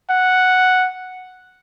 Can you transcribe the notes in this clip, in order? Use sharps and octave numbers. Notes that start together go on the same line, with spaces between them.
F#5